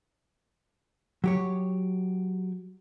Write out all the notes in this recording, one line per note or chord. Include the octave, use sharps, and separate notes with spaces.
F#3 G4 C#5